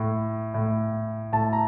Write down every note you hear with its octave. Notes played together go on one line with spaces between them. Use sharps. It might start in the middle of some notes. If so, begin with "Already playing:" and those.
Already playing: A2
A2
A2 A5
A#5